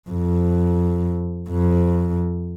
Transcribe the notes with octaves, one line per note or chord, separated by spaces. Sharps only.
F2
F2